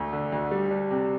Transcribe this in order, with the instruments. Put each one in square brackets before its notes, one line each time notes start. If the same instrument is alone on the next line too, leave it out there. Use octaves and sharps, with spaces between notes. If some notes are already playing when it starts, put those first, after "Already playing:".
Already playing: [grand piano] D2 A3
D3
D2
G3
D4
C3